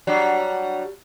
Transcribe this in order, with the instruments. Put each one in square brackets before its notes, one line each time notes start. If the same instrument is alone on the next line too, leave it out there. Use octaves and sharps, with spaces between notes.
[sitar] F#3 G3 D4